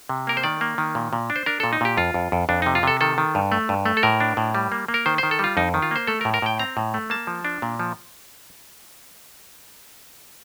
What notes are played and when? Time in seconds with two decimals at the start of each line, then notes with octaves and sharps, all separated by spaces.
0.09 C3
0.27 A#3 A#4
0.37 C5
0.43 D#3 D5
0.61 A#3
0.78 D#3
0.95 A#2
1.13 A#2
1.30 D4
1.36 C5
1.46 D4 A#4
1.60 A#2 A4
1.73 D#4
1.81 A#2 G4
1.97 F2 F4
2.14 F2
2.32 F2
2.49 F2 D4
2.62 C3 D#4
2.75 F4
2.83 C3 A4
3.01 D#3 A4
3.18 D#3
3.35 G2
3.52 A3
3.69 G2
3.86 A3
3.97 A4
4.03 A2 A#4
4.20 D4
4.37 A2
4.55 G3
4.72 A#3
4.88 A#3
4.94 A#4
5.06 D#3 C5
5.18 D#3 C5
5.31 A4
5.39 G3 F4
5.57 F2 D#4
5.74 D#3
5.82 F4
5.91 A#3 C5
6.07 A3 A4
6.21 A#4
6.25 A2
6.34 A#4
6.42 A2 G5
6.59 C4 A#5
6.77 A2
6.94 A3
7.10 A#3 A5
7.27 F3
7.45 D4
7.62 A#2
7.80 F3